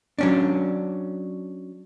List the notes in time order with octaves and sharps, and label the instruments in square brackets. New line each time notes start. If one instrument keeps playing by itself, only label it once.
[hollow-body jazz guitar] F#3 C#4 D4